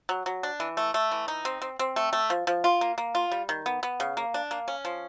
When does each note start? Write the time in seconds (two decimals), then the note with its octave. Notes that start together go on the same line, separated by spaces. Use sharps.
0.09 F#3
0.26 F#3
0.43 D4
0.60 E3
0.77 A3
0.94 A3
1.11 E3
1.28 D#4
1.45 C4
1.62 C4
1.79 C4
1.96 A3
2.13 A3
2.30 F3
2.47 F3
2.64 F4
2.81 A#3
2.98 A#3
3.15 F4
3.32 G3
3.49 D#3
3.66 B3
3.83 B3
4.00 C#3
4.17 A#3
4.34 D4
4.51 A#3
4.68 C#4
4.85 F3